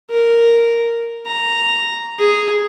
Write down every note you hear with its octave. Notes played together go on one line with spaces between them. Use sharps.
A#4
A#5
G#4